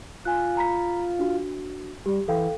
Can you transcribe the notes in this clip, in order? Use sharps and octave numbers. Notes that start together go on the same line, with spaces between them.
F4 G#5 F#6
A#5 B5 B6
D4 F#4
G3 G4
E3 A4 F5 G5